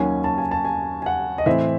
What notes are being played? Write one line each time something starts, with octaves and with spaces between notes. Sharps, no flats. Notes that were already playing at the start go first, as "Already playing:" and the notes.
Already playing: D#2 D#3 F#3 C#4 G#5
A5
G#5
A5
G#5
G#5
F#5
D#5
A2 E3 C4 E5